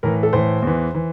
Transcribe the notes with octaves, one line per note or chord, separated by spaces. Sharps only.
A2 E3 A#4
A4
A2 E3 C5
E2 E3
E3